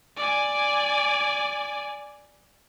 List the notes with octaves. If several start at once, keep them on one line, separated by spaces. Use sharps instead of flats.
D5 G#5